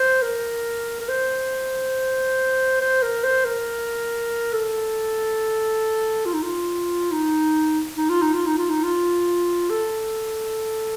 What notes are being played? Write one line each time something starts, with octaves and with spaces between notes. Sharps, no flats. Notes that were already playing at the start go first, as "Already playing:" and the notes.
Already playing: C5
A#4
A#4
C5
C5
A#4
C5
A#4
A4
F4
D#4
F4
D#4
D#4
F4
D#4
F4
D#4
F4
D#4
F4
A4